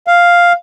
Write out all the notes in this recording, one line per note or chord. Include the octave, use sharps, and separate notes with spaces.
F5